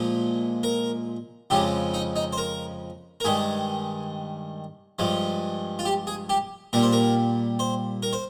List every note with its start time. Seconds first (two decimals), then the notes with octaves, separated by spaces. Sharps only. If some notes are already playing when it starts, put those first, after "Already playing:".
Already playing: A#2 F3 G#3
0.63 A#4
1.50 F2 C#3 F3 G#3 G4
1.94 D#4
2.16 D#4
2.33 C5
2.37 A#4
3.20 A#4
3.24 G2 D#3 G#3 G#4
4.99 G2 F3 G#3
5.79 F4
5.85 G4
6.07 G#4
6.29 G4
6.73 A#2 G3 A#4
6.83 C5
6.93 A#4
7.59 C5
8.03 A#4
8.13 C5